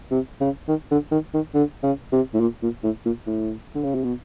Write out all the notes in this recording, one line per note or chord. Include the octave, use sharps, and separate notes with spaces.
C3
C#3
D#3
D3
D#3
D#3
D3
C#3
C3
A2
A#2
A#2
A2
A#2
A2
D3
C#3
C3
B2